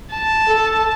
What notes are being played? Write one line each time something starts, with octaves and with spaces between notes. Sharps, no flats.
A5
A4